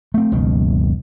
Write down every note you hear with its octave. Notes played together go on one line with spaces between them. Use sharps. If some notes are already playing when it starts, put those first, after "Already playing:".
A3 C4
F#1 C#2 B2 D#3